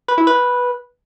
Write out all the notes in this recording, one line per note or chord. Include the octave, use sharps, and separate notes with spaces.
B4
E4
B4